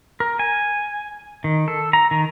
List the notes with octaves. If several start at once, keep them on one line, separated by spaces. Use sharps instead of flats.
A#4
G#5
D#3
A4
A#5
D#3